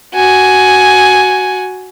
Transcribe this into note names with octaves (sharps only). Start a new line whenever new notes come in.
F#4 G#5